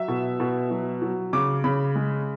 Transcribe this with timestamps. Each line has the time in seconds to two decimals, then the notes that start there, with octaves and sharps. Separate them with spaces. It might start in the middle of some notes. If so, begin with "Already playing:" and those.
Already playing: F#3 E5
0.08 B2
0.40 B2
0.70 F#3
1.02 F#3
1.33 C#3 D6
1.64 C#3 B5
1.95 G#3